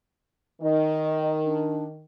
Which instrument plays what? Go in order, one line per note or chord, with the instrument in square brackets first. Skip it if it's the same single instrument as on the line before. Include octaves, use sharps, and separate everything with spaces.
[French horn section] D#3 [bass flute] D#5
[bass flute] D4